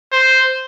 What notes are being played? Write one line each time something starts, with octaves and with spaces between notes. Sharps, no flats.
C5